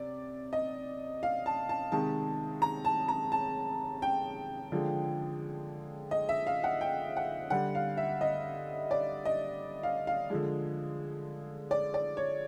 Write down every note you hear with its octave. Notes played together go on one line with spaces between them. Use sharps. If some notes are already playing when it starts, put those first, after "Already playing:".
Already playing: C3 D5
D#5
F5
A5
A5
C3 D#3 G#3 A5
A#5
A5
A#5
A5
G5
D3 F3 G#3
D#5
E5
F5
F#5
G5
F#5
D3 G3 F#5
F5
E5
D#5
D5
D#5
F5
F5
D3 F3 G#3
D5
D5
C#5